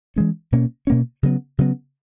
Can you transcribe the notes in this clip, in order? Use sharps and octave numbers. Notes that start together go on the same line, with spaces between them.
E3 G#3 C#4
B2 A#3 C#4
B2 A#3 C#4
C#3 F#3 B3
C#3 F#3 B3